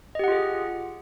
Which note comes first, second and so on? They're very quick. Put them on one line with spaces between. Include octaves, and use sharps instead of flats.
D#5 G4 F#5 F4 G#4